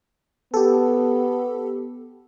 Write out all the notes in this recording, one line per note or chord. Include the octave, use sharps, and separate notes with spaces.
B3 G4 A4